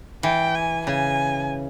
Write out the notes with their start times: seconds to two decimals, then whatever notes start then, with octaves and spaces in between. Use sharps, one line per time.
0.23 E3 G5
0.55 G#5
0.87 C#3 G#5